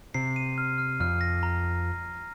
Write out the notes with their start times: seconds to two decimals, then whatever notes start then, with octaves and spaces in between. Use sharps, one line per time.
0.14 C3 C7
0.36 D#7
0.58 F6
0.78 F6
1.00 F2 F6
1.21 A#6
1.43 A#5